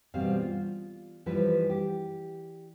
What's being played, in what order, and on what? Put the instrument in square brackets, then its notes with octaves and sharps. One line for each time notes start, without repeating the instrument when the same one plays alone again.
[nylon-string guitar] B2 E3 G3 C4 F5
F4
E3 F3 G3 B4
G4